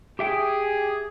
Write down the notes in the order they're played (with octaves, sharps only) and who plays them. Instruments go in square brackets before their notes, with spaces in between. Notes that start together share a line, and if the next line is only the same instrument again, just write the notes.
[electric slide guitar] G4 E5 G5 [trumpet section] G#4